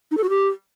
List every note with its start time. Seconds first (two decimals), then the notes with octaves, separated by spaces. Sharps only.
0.11 D#4
0.17 A4
0.24 F#4
0.30 G4